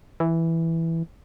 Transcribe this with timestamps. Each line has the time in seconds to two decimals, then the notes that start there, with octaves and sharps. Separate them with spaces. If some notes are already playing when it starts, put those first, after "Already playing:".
0.20 E3